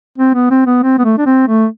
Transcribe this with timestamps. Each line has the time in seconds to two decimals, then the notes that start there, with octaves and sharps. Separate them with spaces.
0.18 C4
0.34 B3
0.50 C4
0.67 B3
0.83 C4
0.99 B3
1.05 A3
1.18 D4
1.26 C4
1.47 A3